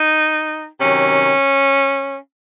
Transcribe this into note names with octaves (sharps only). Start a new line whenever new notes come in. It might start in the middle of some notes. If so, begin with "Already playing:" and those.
Already playing: D#4
C3 D#3 F#3 C#4